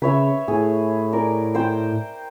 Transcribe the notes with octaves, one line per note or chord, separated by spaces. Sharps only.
C#3 B4 C#5 E5
A2 G#4
A#4 D5
C5 G5